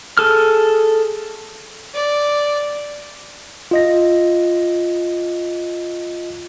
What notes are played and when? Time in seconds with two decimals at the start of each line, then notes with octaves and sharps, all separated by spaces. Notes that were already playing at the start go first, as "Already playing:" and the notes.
0.17 G#4 A4 F6
1.94 D5
3.71 F4 D#5 A#6